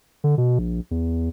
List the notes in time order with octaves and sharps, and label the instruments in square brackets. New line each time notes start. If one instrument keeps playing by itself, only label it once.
[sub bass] D3
B2
A#1
E2